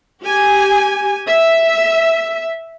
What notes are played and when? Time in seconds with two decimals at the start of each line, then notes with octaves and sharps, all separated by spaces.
0.22 G4 G#5
1.28 E5